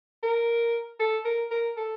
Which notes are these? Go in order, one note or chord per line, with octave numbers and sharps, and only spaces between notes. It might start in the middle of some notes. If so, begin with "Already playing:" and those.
A#4
A4
A#4
A#4
A4